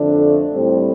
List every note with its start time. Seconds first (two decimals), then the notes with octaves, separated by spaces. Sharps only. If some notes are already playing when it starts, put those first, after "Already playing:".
Already playing: F2 D3 A3 D4
0.53 A2 G3 C4